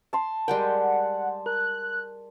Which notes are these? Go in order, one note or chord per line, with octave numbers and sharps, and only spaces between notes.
A5 C6
G3 G#3 A#4 F#5 G5
A#4 F#6